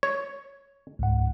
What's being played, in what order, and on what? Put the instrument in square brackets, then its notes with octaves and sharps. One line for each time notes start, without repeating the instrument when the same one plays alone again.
[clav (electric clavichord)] C#5
[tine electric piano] C#2 G#2 F#5